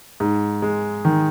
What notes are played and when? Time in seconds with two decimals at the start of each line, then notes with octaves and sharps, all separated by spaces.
0.20 G#2
0.62 G#3
1.05 D#3